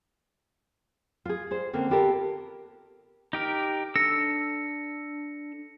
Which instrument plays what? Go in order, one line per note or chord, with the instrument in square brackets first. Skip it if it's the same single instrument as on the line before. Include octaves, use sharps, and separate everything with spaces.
[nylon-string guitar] F4 G#4
G#4 C5
D3 A#3 C4 C#4
B3 F4 G4 A4 A#4
[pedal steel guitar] D#4 G4 A#4
[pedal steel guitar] D4 A4 E6 [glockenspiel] A#6 C#7